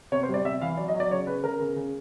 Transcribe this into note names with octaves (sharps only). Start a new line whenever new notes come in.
C3 C#5
C5
G3
D5
C3 E5
E3 F5
F#3 D5
D#5
F#3
D5
C#3 C#5
C#3 B4
C#3 A#4
C#3
C#3